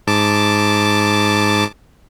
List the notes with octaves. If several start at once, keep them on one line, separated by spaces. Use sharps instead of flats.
G#2 A5 D6